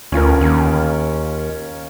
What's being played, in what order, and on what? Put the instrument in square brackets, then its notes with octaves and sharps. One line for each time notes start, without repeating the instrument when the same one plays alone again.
[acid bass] D2 [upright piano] C#4 F4 A#4
[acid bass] D#2